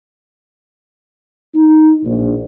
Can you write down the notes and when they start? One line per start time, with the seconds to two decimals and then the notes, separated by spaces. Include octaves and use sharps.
1.55 D#4
2.05 A#1